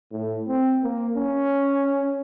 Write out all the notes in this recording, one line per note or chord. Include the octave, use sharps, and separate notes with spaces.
A2
C4
A#3
C#4